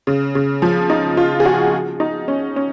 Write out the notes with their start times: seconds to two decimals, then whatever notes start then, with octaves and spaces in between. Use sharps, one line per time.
0.07 C#3
0.35 C#3
0.62 F3
0.90 D#4
1.17 F4
1.40 G#4
1.46 F#4
2.00 D#4
2.28 C#4
2.56 C#4